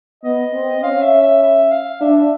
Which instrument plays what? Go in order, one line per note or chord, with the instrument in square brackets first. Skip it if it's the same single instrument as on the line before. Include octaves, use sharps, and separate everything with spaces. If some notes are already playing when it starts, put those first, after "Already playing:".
[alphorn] B3 [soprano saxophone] D#5
[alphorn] C4
[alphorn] C#4 [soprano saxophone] F5
[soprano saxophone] E5
E5
E5
F5
[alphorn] D4 [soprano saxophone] E5
[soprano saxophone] E5